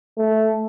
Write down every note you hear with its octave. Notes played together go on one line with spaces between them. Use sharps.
A3